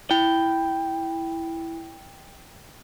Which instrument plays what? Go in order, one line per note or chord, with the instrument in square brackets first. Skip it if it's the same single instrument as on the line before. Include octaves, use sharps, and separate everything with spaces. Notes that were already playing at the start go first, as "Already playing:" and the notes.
[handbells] E4 [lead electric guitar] G5